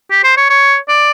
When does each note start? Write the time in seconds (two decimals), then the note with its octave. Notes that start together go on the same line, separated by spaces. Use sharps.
0.11 G4
0.24 C5
0.37 C#5
0.50 C#5
0.88 D5